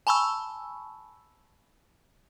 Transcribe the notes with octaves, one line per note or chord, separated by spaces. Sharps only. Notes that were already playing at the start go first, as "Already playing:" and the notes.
G#5 A5 B5 C#6 E6